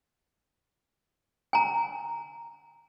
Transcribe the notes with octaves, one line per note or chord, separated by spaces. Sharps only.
G#5 A#5